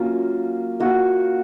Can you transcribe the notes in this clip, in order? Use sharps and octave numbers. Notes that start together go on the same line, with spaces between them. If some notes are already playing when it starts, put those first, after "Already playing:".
Already playing: F#3 A#3 C#4 F4
A#3 F4 F#4